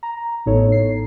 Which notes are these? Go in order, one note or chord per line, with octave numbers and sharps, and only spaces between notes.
A#5
A1 A2 B3 D#4 A4 C#5
C7